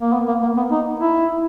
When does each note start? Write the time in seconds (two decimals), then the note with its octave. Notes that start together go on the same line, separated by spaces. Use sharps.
0.02 A#3
0.13 B3
0.28 A#3
0.42 A#3
0.57 B3
0.71 D#4
1.00 E4